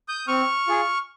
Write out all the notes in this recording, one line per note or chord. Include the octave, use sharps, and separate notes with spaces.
D#6 G6
C4 C#6 F6
F4 G#4